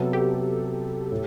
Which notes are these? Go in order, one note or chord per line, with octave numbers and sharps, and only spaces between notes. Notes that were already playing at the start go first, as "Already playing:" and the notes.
Already playing: C3 F#3 B3 A4
G4
A2